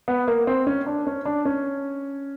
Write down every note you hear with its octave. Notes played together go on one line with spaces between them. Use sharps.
B3
A#3
C4
C#4
D4
C#4
D4
C#4